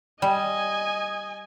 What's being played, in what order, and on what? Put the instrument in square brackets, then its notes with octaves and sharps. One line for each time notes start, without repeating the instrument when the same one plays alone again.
[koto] G3 [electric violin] D#5 G#5